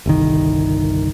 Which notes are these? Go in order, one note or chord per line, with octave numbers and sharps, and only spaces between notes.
G1 C2 D#3